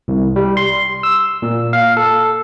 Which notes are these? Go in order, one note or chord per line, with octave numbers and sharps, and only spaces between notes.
C2
G3
C6
E6
A#2
F5
A4